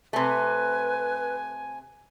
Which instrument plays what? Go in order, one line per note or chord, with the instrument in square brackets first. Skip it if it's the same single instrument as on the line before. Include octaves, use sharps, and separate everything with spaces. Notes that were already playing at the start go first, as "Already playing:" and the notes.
[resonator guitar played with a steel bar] C3 A3 [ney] B4 [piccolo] G#5